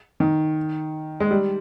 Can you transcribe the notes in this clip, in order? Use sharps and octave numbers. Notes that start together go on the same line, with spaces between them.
D#3
G#3
G3